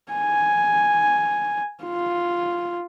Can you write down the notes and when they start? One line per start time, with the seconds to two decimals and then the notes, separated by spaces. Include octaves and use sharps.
0.12 G#5
1.84 F4